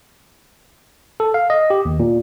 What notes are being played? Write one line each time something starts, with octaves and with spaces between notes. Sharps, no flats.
A4
F5
D#5
G4
D#2
A#2